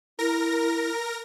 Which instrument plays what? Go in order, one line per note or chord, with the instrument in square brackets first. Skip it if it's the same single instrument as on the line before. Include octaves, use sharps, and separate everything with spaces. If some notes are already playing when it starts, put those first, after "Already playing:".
[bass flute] E4 [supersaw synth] A#4 A#6